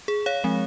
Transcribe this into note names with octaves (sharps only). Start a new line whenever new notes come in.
G#4
C#5 F5
F3 G#3 C4